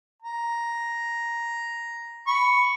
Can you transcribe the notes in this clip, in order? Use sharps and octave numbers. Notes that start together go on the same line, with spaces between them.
A#5
B5 C#6